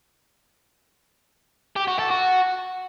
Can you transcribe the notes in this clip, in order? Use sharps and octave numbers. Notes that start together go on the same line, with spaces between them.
G4
F#4
A4
F#4